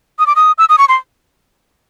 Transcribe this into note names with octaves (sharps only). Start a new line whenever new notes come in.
D#6
D6
D#6
E6
D#6
C#6
C6